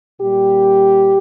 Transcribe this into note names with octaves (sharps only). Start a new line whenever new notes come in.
A#2 G3 G4